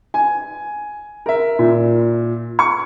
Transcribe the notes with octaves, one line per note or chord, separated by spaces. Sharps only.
G#5
A#4 E5
A#2
C#6